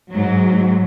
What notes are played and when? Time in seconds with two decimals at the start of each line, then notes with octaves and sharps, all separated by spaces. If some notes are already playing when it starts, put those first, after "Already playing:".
0.12 G#2 F#3